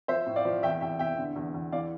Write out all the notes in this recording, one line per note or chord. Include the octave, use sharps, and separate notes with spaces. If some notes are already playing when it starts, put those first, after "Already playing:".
F3 C5 E5
A2
D5 F5
F3
E2 E5 G5
E2 E5 G5
E2 E5 G5
D3
E2
E2
E3 D5 F5